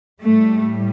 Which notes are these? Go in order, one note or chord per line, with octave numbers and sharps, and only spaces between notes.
A2 G3 A3